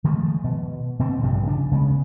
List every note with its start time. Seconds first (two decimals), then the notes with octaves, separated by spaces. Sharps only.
0.04 D#3 F3 G#3 A3
0.44 B2
0.99 B2 D3 C4
1.22 A#1 G2 C3 F3
1.44 C#3 D4
1.71 C#3 G#3 A3 B3